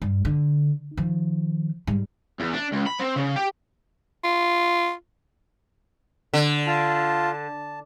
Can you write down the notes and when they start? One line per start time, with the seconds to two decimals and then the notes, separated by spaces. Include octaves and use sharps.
0.02 G2
0.25 D3
0.97 D#3 F3
1.87 G#2 G3
2.40 E2
2.53 D4
2.72 C#2
2.86 B5
3.00 C4
3.16 C#3
3.36 G4
4.24 F4
6.34 D3
6.67 F4 A5
7.33 A5